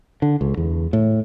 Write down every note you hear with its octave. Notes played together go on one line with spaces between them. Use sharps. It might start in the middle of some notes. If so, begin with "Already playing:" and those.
D3
C#2
E2
A2